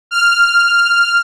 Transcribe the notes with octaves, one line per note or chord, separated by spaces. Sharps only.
F6